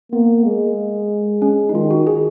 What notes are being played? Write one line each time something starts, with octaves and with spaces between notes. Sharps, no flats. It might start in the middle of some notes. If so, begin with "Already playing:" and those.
A#3 B3
G#3
G#3 C#4
D#4
D#3 F4
F#4
G#4